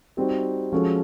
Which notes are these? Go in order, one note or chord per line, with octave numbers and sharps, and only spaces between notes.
G3 C4 D#4 F#4
F3 G#3 C#4 F#4 A4